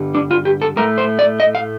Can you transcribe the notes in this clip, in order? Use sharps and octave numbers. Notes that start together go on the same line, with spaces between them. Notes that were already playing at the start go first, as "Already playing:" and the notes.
Already playing: G2 D3 G3
D4
F4
G4
A4
A2 A3 A#4
C5
D5
D#5
F5